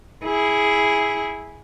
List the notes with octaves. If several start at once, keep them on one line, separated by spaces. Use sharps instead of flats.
E4 G#4